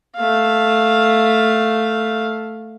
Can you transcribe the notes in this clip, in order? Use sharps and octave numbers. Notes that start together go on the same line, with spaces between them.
A3 F5